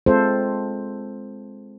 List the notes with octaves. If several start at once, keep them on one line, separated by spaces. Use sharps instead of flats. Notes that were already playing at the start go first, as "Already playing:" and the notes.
G#3 C4 F4 A4 C5